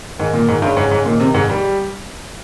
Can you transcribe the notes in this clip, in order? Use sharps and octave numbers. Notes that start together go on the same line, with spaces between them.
G#2 D#3
A#2
G#2
G2 C#3
G#2
G#2
A#2 D#3
C3
G#2
G3